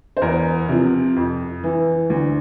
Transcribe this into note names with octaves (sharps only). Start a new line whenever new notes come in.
C5
E2 A#4
C3 F3
F2
E3
D2